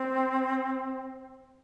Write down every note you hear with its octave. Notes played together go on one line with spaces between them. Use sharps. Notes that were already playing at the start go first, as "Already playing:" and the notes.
Already playing: C4